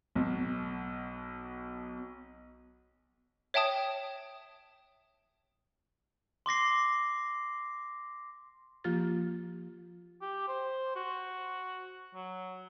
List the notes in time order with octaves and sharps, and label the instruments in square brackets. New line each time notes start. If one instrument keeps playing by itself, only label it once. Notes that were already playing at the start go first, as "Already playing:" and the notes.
[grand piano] B1 B2
[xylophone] C#5 E5 G5 A5 D#6
[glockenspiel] C6 D6 A#6 C7
[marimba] F3 A#3 F4 G4 A6
[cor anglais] G4
C5
F#4
F#3